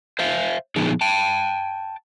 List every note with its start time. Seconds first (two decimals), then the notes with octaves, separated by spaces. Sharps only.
0.19 C5 E5 F5
0.76 A#2 F3 B3 D4 D#4 G#4
1.01 G5 A5